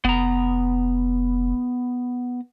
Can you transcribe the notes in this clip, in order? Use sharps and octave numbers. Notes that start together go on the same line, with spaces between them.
F1 B3 A#5